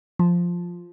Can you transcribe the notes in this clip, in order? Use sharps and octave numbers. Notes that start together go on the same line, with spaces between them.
F3